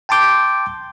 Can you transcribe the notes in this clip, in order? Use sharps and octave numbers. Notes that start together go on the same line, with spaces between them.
G5 A5 C6 D6 G6